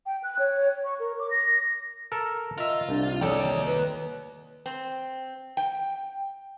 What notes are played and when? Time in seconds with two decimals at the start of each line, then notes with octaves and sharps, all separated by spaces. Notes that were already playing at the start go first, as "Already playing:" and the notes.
0.06 G5
0.23 F#6
0.39 C#5
0.85 C#6
1.00 A#4
1.19 D6
1.31 A#6
2.12 A4 A#4
2.58 F4 A#4 D#5 E5
2.89 C2 D4
3.21 D#2 A4 C#5 D5 G5
3.66 B4
4.66 C4
5.57 G5